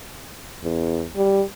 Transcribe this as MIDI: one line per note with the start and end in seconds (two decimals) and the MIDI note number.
0.63 1.05 40
1.16 1.42 55